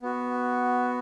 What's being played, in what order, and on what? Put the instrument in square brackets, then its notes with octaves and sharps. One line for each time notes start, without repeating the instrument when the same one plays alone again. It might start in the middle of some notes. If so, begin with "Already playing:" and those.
[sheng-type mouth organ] B3 F#4